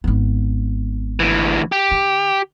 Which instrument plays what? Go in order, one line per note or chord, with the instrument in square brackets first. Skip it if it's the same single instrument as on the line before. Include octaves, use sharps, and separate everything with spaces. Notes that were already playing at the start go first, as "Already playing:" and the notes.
[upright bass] G#1 B3
[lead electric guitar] D2 E3
G4
[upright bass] D3